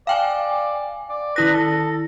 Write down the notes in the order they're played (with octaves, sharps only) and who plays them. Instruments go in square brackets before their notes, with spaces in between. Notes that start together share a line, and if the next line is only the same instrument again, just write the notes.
[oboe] D5 [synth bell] F5 G5 G#5
[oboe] D5
[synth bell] D#3 E4 A#6 [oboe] B4
[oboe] A4